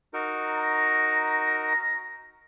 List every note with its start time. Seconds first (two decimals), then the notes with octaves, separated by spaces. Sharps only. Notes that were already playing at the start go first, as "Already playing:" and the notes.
0.14 D#4 F#4 A#4
0.56 A#5